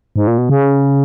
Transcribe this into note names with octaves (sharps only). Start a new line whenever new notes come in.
G#2
A#2
B2
C#3